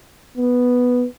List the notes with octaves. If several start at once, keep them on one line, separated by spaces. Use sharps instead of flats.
B3